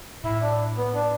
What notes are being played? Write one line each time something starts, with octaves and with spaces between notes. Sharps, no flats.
A2 E4
D4
B3
D4